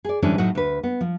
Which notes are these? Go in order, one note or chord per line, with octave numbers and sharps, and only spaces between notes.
G#4 D5
G#2 D3 E3 G3 C#4 D4
A2 F#3 D#4 F#4
D2 B4
B3
F3